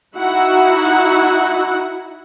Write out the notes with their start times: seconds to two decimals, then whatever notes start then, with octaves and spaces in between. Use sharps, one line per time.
0.16 D#4 E4 F#4 F#5